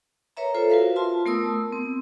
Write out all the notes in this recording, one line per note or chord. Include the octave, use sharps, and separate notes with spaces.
A#4 B4 C#5 E5 A#5
F4 A4 C5
F#4 A#4 B4 E5 F5
F4 A5 C6
A3 B3 A#4 A5 D#6 E6
C4